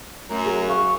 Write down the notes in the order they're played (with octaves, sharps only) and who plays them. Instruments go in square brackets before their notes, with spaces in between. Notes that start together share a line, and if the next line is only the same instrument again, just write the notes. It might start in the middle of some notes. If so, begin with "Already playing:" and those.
[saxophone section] F#2 [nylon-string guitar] A3 [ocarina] A#5
[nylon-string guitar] G#4
[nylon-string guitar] F5 [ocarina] C#6